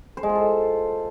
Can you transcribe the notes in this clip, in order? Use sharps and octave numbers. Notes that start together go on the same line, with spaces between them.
C5
G#3
F4
A4